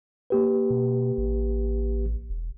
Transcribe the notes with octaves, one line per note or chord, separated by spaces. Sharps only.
A#3 G4 B4
B2
A1
E1